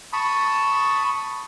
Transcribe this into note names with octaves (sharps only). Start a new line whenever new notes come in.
A5 B5 C#6 D#6